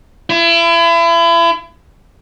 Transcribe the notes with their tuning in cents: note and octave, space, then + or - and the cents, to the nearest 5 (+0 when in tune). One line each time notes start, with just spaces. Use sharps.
E4 +35